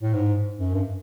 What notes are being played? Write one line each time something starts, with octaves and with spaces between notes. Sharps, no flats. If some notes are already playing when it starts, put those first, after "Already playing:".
A2
G#2
F#2
G2